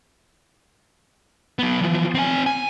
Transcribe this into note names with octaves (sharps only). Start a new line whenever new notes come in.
F#3 B3
E3 F3
C4 G#5
G#5